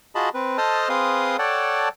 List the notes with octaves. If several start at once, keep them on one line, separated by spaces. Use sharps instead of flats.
F4 F#4 G#4 D#5 A5 B5
C4 B4
A4 C5 D#5 A5 D#6 F6
C4 G#4 B4 F5 C6 D#6
A4 C#5 D5 F#5 G5 A5